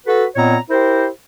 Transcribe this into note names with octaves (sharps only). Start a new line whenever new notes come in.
F#4 A4 B4
A#2 B3 C4 C#5 D#5 A#5
E4 G4 A#4 C5